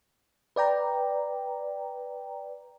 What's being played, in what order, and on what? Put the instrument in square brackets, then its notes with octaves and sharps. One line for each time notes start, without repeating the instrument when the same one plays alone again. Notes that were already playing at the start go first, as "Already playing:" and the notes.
[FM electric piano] B4 D5 G5 A#5